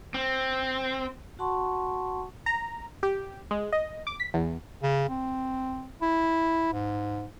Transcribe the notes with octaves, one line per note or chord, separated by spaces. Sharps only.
C4
F#4 F#5 A5 C6 C#6
A#5
G4
G#3
D#5
D6
B6
E2
C#3
C4
E4
G#2